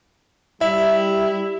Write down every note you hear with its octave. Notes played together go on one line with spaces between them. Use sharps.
G3 E4 E5